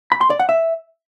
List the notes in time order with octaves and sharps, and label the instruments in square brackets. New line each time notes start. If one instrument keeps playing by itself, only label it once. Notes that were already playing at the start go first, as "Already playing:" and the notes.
[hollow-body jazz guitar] B5
C6
D5
F#5
E5